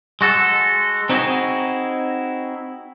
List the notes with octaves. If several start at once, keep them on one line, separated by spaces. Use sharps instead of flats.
G#3 F#4 A4
C4 D#4 E4 F#4 G#4